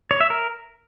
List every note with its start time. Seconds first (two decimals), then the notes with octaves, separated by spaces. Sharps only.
0.11 C#5
0.21 E5
0.30 A#4